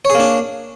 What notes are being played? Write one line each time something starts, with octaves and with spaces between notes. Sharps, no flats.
A#3 D4 G#4 C#5